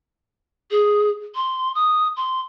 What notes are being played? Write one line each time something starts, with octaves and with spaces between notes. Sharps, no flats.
G#4
C6
D#6
C6